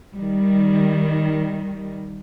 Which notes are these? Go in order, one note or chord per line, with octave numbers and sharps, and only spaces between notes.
D#3 G3